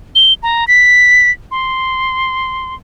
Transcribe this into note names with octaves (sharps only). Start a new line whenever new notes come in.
G7
A#5
B6
C6